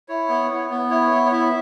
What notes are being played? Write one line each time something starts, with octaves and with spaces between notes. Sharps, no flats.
E4 C#5
B3
B3
B3
E4 C#5
B3
C#5
E4 E5